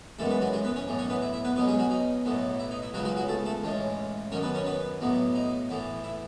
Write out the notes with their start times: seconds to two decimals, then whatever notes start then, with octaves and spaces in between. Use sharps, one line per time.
0.19 F#2 E3 G#3 A3 B3 A4
0.30 B3 B4
0.41 F#3 F#4
0.53 G#3 G#4
0.64 B3 B4
0.76 C#4 C#5
0.88 B1 A2 E3
0.99 C#4 C#5
1.10 B3 B4
1.22 E4
1.33 E4
1.45 B3 B4
1.56 B1 B2 F#3 B3 C#4 B4
1.67 G#3 G#4
1.79 F#3 F#4
1.90 D#4
2.25 B1 A2 F#3 B3
2.59 E4
2.71 D#4
2.82 E4
2.94 C#2 C#3 F#3 B3 F#4
3.05 F#3 F#4
3.17 F#3 F#4
3.28 A3 A4
3.45 A3 A4
3.62 A1 A2 G#3 C#4
4.32 F#2 D#3 F#3 C#4 C#5
4.43 B3 B4
4.55 C#4 C#5
4.66 B3 B4
5.01 B1 A2 F#3 B3
5.35 D#4
5.69 A2 E3 B3
6.04 E4